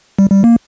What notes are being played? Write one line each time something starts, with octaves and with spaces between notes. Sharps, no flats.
G3
G3
A#3